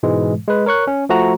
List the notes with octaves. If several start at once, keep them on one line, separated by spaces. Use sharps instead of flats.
G#2 B2 E3 G#3
G#3 B4
A#4 C#5 C#6 F#6
C#4
F3 A3 F#4 A#5